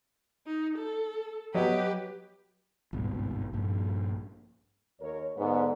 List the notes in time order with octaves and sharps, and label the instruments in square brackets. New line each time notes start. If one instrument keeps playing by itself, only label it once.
[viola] D#4
A4
[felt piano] F#3 C#5 D#5 [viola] G4 B4
[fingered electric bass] G#1 C#2 G2 B2
A#1 G2 A#3
[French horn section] D#2 A#4 C#5
[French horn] G#2 [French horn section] D3 B3